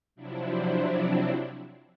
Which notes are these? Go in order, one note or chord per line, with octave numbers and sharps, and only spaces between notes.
C3 F3 F#3 C4 D4 E4